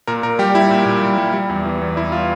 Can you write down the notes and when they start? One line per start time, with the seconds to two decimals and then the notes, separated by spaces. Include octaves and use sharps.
0.07 A#2 A#4
0.23 A#2 A#4
0.39 G3 G4
0.55 G3 E4
0.71 A#2
0.86 A#2
1.02 G3
1.18 G3
1.34 G3
1.50 E2
1.65 E3
1.81 E2
1.96 G3 E4
2.12 F4